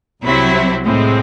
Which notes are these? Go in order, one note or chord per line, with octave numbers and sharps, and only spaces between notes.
C2 C3 F#3 C4 E4
A2 G#3 C4